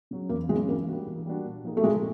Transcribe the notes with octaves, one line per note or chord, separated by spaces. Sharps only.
C#3 F#3
E2 A#3
F#3 G#3
C#3
E3 A#3
G3 A#3 D4 F#4
E3
G3 A#3 D4 F#4
A#2
F3 A#3 D#4 G#4
A3
A#2 G#3